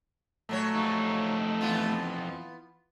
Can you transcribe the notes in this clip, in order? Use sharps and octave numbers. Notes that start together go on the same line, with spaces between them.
A#2 F#3 A3 C#5
F2 D#4
E3 B3 F4